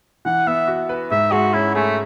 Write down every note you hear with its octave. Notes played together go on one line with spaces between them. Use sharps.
E3 F#5
B3 E5
F#4
B4
G#2 E5
G#3 F#4
C#4 E4
A3 G#4